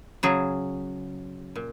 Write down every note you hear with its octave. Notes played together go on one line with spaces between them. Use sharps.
C#3 F#3 G#4
A#2